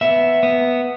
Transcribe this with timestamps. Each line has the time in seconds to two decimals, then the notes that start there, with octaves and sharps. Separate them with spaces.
0.01 B3 E5
0.43 B3